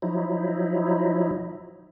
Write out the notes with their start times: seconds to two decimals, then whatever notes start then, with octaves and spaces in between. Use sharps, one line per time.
0.02 F3 F#3 D#4 E4